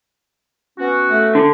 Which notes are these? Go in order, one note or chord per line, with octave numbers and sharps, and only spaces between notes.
B3 C#4 F#4
A3
D3